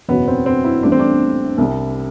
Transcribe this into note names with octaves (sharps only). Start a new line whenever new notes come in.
F#1 E2 B2 F#3 B3
C4
C4
E4
A1 A2 G3 D4
C4
D4
C2 C3 G3